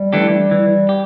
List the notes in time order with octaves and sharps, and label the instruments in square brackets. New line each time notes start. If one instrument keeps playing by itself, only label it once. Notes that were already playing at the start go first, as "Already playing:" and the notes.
Already playing: [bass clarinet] G3
[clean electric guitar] E3 A3 D4 G4
E3
G4